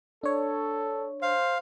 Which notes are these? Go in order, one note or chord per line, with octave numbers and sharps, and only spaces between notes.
D4 A4 C#5
C5 F5